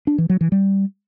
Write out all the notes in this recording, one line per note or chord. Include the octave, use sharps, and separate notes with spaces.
D4
E3
F#3
E3
G3